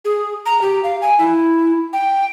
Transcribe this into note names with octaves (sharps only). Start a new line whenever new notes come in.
G#4
A#5
G4
F5
G#5
E4
G5